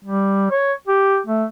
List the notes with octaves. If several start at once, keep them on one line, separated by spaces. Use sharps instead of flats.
G3
C#5
G4
A3